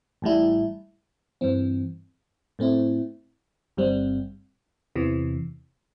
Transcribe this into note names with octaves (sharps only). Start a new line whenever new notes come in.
A1 A2 G3 E4
G2 E3 C4
A2 A3 C4 E4
G1 G2 G3 C4
E2 C3 E3